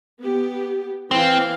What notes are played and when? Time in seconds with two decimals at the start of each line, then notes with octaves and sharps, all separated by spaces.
0.20 B3 G4
1.11 E3 C4 F5